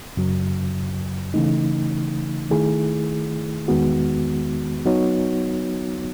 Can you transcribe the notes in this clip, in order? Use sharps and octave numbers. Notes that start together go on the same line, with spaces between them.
F#2 C#3 F#3
C#3 E3 A3 D#4
D#3 A3 E4 G#4
E2 D#3 G#3 B3 F#4
F#3 B3 D#4 F#4 C#5